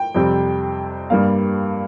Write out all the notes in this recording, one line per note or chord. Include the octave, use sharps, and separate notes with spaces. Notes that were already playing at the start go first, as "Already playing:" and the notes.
Already playing: G5
F2 C3 G3 C4
G2 G3 A#3 F5